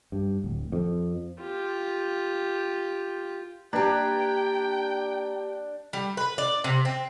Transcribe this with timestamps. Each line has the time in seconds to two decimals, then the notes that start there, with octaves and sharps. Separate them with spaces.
0.12 G2
0.44 D1
0.72 F2
1.40 F4 G4
3.73 A#3 D4 G4 B4 G5 A#5 G#6
5.93 G3
6.17 B4
6.38 D5
6.64 C3
6.85 C4